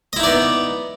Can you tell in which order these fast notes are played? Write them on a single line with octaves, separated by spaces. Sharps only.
D#5 E4 D#4 D5 B3